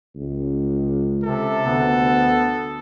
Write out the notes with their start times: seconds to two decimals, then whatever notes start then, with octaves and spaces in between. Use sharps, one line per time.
0.16 C#2
1.24 C3 A4
1.66 D2 B3